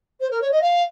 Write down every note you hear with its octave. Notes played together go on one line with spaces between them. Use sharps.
C5
A#4
C#5
D#5
F5